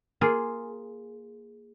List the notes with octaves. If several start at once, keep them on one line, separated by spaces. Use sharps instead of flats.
A#3 F4 G#4